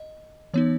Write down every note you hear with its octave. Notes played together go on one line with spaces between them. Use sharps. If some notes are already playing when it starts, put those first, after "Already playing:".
Already playing: D#5
E3 B3 D#4 C#5